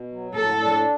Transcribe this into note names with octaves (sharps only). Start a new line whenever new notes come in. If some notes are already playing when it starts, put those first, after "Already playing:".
Already playing: B2
F#3
A2 A4
D4